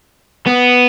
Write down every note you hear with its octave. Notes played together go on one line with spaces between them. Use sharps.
B3